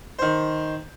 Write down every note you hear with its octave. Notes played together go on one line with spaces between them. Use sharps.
D#3 C5